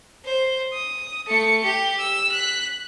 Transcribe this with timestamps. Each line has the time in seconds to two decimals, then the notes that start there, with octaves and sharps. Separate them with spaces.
0.25 C5
0.73 D#6
1.27 A3 C#7
1.64 G4
1.99 E6
2.32 F#6 B6